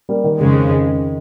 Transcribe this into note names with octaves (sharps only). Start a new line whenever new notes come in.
G3 A#3
D#3
F2 C#3 G#3